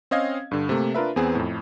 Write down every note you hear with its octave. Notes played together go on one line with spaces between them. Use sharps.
C4 C#4 D#5 F5 G#6
G2 D3
C3 A3 A#3
D4 F4 A#4 B4 E5
E2 B3 C4 G#4
F2 A2